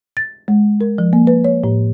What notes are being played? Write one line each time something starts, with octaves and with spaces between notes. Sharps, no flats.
A6
G#3
A#4
F3
A#3
B4
C#5
A2